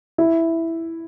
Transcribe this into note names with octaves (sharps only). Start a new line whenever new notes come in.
E4